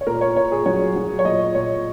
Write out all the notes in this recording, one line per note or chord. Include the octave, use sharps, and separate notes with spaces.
C#5
A#2 A#4
C#5
A#2 C#5
G#4
F#3 C#5
F#3
C#5
A#2 D#5
A#2 C#5